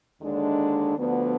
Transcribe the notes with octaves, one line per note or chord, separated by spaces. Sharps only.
D#2 D3 G#3 D4
D2 D3 F3 B3